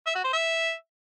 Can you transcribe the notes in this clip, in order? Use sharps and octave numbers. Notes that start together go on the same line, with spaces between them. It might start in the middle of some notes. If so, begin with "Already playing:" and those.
E5
F#4
C5
E5